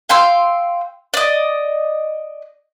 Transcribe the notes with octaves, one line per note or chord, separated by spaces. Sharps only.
F5 G5 C6 E6
D5 D#5